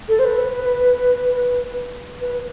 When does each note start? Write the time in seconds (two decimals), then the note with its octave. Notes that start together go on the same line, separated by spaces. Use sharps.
0.09 A4
0.19 C5
0.25 B4
2.21 B4